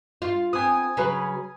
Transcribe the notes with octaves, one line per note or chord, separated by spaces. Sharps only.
F4
B3 C4 G#5 D#6
C#3 F#3 B4